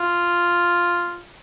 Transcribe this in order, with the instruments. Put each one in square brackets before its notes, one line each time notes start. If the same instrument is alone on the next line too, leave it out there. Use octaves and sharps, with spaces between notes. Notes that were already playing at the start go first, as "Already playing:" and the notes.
Already playing: [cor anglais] F4